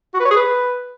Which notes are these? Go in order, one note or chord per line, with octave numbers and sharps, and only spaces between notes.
F#4
B4
C#5
G#4
B4